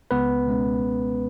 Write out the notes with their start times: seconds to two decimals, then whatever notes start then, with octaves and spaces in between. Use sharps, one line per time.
0.11 C#2 B3 B4
0.47 B2 G#3 C#4
0.83 C#2